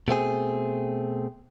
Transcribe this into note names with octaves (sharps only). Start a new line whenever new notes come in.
B2 A3 C4 G#4